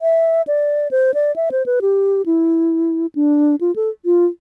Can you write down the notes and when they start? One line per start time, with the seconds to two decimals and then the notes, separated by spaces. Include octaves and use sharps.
0.02 E5
0.47 D5
0.91 C5
1.14 D5
1.36 E5
1.51 C5
1.66 B4
1.82 G4
2.26 E4
3.15 D4
3.61 F4
3.76 A4
4.05 F4